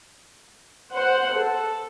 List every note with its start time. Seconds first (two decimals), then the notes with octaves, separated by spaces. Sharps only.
0.93 C5 F#5
1.33 A4